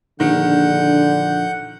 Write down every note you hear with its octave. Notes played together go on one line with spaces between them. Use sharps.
A#1 D3 D#3 F#5 G6